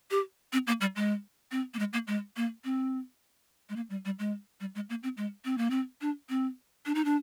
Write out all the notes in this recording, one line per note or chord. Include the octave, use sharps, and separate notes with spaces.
G4
C4
A#3
G3
G#3
C4
A#3
G#3
A#3
G#3
A#3
C4
G#3
A#3
G3
G3
G#3
G3
G#3
A#3
C4
G#3
C4
A#3
C4
D4
C4
D4
D#4
D4